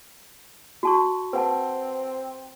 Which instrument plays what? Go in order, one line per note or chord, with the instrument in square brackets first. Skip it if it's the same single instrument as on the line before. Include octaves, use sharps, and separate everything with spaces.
[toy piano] F#4 A5 C#6
[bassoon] C4 [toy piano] B4 F#5 A5